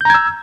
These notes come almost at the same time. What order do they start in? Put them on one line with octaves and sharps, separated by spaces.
G6 A#5 G#6 E6